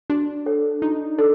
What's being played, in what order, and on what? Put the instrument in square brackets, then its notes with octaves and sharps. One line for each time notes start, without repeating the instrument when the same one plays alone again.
[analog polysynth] D4 [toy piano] F#4
[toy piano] A4 C#5 F#5
[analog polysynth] D#4 [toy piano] F#4
[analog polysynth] D4 [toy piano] A4